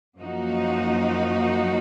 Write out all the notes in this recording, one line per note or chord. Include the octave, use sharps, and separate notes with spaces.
F#2 F3 A#3 D#4 F#4